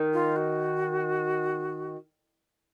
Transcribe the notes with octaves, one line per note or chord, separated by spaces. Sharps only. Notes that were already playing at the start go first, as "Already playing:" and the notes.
Already playing: D#3
F4
F#4